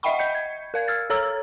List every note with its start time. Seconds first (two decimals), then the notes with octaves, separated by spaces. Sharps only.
0.03 D#5 E5 F#5 G5 B5 C#6
0.19 D#5 G6 C#7
0.35 G#6
0.74 A#4 F5 G#6
0.88 E6 F6 G#6 A6
1.10 A4 C#5 A#5 E6 F6